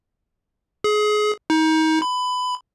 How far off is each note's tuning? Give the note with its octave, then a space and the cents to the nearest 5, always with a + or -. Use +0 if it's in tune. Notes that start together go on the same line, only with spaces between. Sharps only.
G#4 +25
D#4 +30
B5 +20